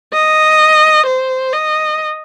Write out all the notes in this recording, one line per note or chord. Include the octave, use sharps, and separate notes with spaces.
D#5
C5
D#5